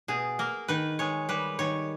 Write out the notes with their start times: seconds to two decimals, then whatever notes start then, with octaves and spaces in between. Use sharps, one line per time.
0.08 B2 G#4
0.39 A#3 A#4
0.68 D#3 B4
0.99 G#3 C#5
1.29 G3 B4
1.59 D#3 C#5